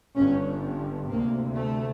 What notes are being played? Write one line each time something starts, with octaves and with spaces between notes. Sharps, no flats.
G1 G2 C#4
D2 C3 A#3
A3